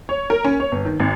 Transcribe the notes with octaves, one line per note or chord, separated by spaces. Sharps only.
C#5
A#4
C#4
C#5
G1
D#3
G#1